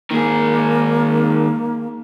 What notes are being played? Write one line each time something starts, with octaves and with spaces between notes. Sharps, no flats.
D#3 A#3 G#4